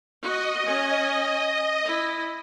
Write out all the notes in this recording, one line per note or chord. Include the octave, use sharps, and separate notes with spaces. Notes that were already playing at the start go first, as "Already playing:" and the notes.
F#4 D#5
C#4 G#5
E4